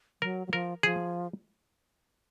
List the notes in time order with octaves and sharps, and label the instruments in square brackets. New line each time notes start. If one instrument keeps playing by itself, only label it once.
[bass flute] F#3 [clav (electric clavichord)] A#4
[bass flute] F#3
[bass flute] F3 [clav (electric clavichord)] A#4
[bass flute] F3 [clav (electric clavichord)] G#4